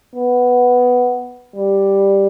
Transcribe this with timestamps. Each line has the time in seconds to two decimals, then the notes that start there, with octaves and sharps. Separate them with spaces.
0.16 B3
1.55 G3